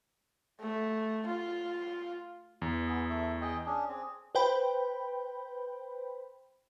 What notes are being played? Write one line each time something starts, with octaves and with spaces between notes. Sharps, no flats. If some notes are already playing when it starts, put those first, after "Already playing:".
A3
F4
E2
B3 G#4
A3 E5
G#4 D#5 G5
C#4 D4 G#4
C4 G#4
B4 C5 G5 B5